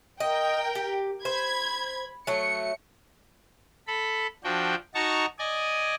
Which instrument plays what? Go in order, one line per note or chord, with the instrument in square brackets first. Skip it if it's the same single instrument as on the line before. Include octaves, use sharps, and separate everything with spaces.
[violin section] A#4 G5 [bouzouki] D#5
[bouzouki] G4
[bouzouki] C5 [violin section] B5 G#6
[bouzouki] F#3 A3 [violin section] C#7
[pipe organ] A4 B5
F3 D4 F#4 G5
D#4 F#4 A5 A#5 C#6
D5 D#5 G#5